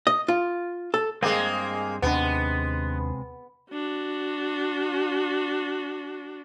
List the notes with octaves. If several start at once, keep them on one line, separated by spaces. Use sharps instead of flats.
D#5
F4
A4
G2 G#3 A#3 C4 G#4
D#2 C3 G#3 B3 C#4 D4
D4 F#4